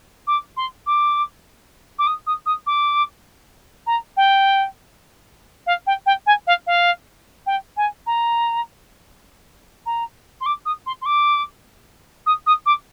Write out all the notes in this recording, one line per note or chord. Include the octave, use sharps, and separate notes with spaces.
D6
C6
D6
D6
D#6
D#6
D#6
D6
A#5
G5
F5
G5
G5
G#5
F5
F5
G5
G#5
A#5
A#5
C6
D6
D#6
C6
C6
D6
D#6
D#6
D6